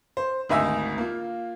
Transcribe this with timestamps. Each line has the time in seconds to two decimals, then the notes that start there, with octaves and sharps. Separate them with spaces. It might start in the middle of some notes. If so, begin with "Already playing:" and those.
0.17 C5
0.49 G#1 D2 D#5 E5 G#5 E6
0.98 A#3 F4